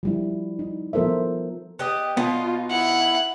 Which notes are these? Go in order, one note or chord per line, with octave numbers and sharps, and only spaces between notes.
F3 G3 E4
D#4
F3 B3 A4 A#4 C5 E5
B3 G4 D#5
B2 B3 D#4 F4
E4 F#5